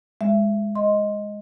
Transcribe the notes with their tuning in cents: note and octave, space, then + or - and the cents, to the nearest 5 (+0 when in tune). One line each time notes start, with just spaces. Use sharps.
G#3 -5 E5 +25
D#5 +5 C6 +0